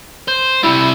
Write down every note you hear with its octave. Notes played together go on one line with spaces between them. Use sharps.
C5
C3 G3 E4